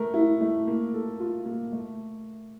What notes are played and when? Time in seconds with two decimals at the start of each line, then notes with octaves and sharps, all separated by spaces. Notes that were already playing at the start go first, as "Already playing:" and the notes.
Already playing: A3 A#4
0.14 E4
0.41 A3
0.67 A#3
0.94 A4
1.19 F4
1.45 A#3
1.72 A3